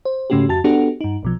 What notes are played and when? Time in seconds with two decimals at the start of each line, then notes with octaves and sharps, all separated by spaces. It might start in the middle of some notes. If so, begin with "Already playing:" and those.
0.05 C5
0.30 G#2 C#3 A3 C#4 F#4 G4
0.49 F2 F#4 A5 A6
0.64 B3 D4 F#4 G4 A4 F#5
1.01 G2 D#4
1.23 B1 B2 F3